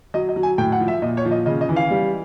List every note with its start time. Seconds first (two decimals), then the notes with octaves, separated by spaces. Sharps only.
0.14 F#3 D#5
0.29 D#5
0.36 F#3
0.43 G#5
0.58 A2 G5
0.72 F#5
0.80 F3
0.88 E5
1.02 A#2 D#5
1.17 C#5
1.25 F3
1.31 D#5
1.46 C#3 D#5
1.61 D#5
1.69 E3
1.76 F5
1.90 G3